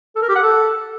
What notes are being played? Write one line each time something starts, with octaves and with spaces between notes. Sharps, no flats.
A4
A#4
G4
F#5
A4